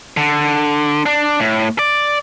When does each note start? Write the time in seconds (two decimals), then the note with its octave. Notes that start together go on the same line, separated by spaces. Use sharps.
0.17 D3
1.06 D4
1.39 A2
1.79 D5